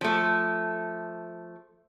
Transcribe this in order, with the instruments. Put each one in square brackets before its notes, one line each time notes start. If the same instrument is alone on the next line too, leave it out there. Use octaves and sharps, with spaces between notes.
[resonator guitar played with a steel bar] F3 A3